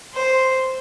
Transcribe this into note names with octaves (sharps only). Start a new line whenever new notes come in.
C5